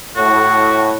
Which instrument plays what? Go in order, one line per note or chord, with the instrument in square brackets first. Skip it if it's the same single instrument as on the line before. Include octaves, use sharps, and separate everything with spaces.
[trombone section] A2 [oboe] F#4